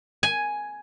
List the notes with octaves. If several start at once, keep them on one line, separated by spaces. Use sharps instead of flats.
G#5